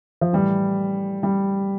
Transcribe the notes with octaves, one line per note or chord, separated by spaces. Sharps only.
F3
A2 E3 G3
G3